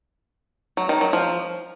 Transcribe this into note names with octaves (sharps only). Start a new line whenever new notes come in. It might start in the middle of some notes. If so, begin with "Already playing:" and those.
F#3
D#3
F#3
F3